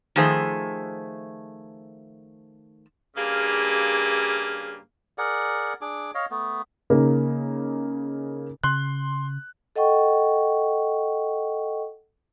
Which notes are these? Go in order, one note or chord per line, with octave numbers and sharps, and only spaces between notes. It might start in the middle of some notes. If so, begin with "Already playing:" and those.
D#3 F3 A3 G#4 C5 E5
G2 C#3 A#3 G#4 F5
G#4 A#4 D5 F#5
D4 G#4 D6
C#5 D#5 F5
A3 B3
C#3 A#3 D#4 G#4 A#4
C#3 C6 F#6
A4 D#5 F#5 G5 C#6